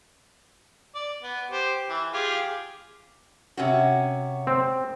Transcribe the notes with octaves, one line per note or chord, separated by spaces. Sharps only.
D5
B3
G4 C5
E3
F4 G4 G#4
C3 C#4 F#4
C4